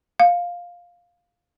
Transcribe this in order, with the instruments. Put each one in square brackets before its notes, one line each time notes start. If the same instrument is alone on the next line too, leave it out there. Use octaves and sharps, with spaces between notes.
[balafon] F5